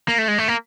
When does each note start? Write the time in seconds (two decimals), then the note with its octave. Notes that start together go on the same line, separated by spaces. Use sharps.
0.08 A#3
0.18 A3
0.28 G#3
0.38 A3
0.48 A#3